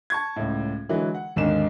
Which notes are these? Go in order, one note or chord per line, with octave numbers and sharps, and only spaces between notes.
A5 C#6 G#6
C#2 A2
D3 E3 F#3 G#3
F#5
G#1 D#2 D3 G#3 D#4 E7